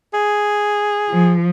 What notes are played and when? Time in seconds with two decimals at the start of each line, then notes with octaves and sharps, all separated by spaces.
0.14 G#4
1.10 F3